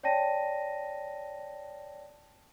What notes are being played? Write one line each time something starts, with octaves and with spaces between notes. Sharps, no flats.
C#5 D5 G5 A5 A#6 D#7